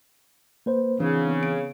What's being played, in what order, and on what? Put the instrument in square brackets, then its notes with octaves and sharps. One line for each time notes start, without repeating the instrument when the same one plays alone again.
[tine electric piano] A#3 B4 C5
[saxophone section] C#3 [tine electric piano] E3 [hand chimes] C4 D4
[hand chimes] B3
D7